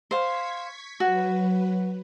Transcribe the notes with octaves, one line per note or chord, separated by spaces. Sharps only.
C5 F5 C#6 G#6 B6
F#3 F#4 B4